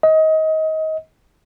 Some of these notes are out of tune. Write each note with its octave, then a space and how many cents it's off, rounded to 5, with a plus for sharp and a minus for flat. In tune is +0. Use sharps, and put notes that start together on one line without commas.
D#5 +25